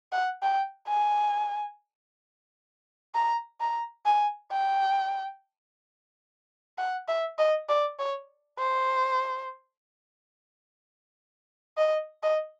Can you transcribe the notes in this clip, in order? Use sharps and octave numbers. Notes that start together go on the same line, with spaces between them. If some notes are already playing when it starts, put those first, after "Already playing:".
F#5
G5
G#5
A#5
A#5
G#5
G5
F#5
E5
D#5
D5
C#5
C5
D#5
D#5